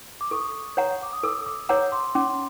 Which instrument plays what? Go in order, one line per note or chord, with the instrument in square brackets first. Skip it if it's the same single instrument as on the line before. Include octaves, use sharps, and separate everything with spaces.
[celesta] D6
[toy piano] A4 [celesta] C#6 D#6
[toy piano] C#5 F#5 A#5
[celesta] D6
D#6
[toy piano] A4 [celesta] D6 E6
[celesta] D6 E6
[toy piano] C#5 F#5 A#5 [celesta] D6 E6
[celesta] C6 D6
[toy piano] C#4 [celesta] C6 D6